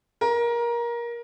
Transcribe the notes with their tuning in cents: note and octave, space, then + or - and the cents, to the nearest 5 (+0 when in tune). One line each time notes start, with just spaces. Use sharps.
A#4 +20